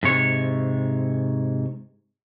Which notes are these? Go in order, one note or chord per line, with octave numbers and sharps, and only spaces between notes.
G#2 C3 C#5